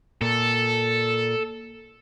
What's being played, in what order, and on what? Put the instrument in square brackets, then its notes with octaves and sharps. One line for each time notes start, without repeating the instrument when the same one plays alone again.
[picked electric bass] A#2 [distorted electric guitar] A4